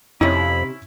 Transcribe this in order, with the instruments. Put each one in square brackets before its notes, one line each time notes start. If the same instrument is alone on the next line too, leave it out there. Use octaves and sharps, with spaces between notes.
[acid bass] F2 [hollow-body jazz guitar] C3 D#4 [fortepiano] C#4 E4 [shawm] B5